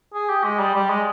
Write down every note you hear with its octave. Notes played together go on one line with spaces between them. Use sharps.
G#4
G4
G#3
G3
G3
G#3